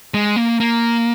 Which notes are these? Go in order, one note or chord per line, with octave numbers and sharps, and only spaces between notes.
G#3
A#3
A#3